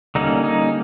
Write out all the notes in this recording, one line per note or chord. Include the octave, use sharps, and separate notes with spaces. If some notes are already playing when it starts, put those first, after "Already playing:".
D3 G3 A#3 C#4 D#4
D#4